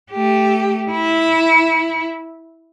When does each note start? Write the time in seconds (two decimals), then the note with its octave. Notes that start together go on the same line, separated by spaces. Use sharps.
0.12 A3 G4
0.91 E4